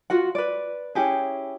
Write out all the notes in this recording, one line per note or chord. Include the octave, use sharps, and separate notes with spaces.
F4 F#4 F#5
B4 D5
C#4 E4 G4 G#4